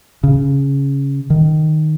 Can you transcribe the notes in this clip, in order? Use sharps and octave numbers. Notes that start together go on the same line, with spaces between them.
C#3
D#3